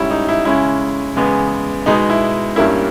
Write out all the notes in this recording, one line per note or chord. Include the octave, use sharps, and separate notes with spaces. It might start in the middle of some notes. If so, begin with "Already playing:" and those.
Already playing: G#2 G3 C#4 E4
D#4
E4
C#3 G#3 C#4 E4
E2 C#3 G#3 B3
B2 G#3 B3 D#4
E4
G2 G3 A#3 C#4 E4